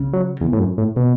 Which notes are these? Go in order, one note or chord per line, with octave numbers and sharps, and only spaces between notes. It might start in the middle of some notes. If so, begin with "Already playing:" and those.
Already playing: C#3
F#3
E2
A2
F#2
A2
B2